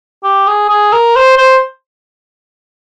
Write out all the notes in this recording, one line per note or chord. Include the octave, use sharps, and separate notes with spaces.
G4
G#4
G#4
A#4
C5
C5